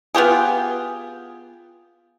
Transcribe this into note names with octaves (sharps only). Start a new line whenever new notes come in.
B3 F4 G4 G#4